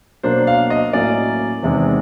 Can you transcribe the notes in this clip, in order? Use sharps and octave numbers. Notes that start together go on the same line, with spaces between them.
B2 F#3 A#3 D4 C5
F5
D#5
A2 F#3 A#3 C#4 D5
E2 C3 D#3 G#3